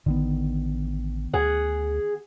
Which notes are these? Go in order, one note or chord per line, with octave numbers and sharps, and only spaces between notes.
A1 D3 D#3 B3
D2 G#4 F#5